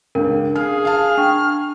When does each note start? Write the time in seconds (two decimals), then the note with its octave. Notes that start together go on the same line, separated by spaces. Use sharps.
0.15 C#2 D4 A#4
0.56 G#4 F5 F6
0.85 F5 A5 F6
1.17 D4 G5 C#6